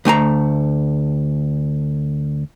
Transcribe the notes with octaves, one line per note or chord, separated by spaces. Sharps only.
D2 A3 G#5 A#5